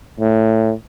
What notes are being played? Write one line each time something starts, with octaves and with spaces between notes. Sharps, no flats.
A2